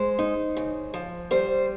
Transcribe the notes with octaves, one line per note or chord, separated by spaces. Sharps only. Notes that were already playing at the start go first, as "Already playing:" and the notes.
Already playing: G#3 C5
D#4
C#3
F3
G3 C5